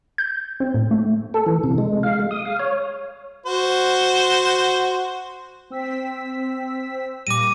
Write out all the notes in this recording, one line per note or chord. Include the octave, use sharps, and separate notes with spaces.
G6
C4
A2
A3
A4
E3
C3
G#3
F5
G#3
D#6
F5
C#5
F#4 C5
C4 E6 B6
A#2 G3 D6 A#6 D#7